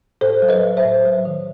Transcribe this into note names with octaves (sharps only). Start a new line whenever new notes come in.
A2 A4 C5
F#3
B4 D#5
F#3
C5 E5
A2
F#3
D#3